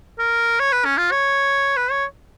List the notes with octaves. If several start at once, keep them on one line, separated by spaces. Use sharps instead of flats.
A#4
C#5
B4
C#4
F4
C#5
B4
C#5